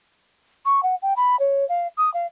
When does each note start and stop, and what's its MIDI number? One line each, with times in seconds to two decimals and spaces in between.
0.65 0.82 85
0.83 0.95 78
1.02 1.13 79
1.16 1.38 83
1.39 1.67 73
1.69 1.87 77
1.97 2.12 87
2.14 2.26 77